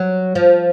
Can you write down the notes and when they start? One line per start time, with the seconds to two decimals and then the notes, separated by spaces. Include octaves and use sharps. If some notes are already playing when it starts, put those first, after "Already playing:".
Already playing: F#3
0.35 F3